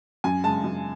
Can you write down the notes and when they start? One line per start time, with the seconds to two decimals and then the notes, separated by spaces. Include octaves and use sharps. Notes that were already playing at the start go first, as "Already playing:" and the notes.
0.24 F#2 G#5
0.44 C#3 G#3 A5
0.64 F#2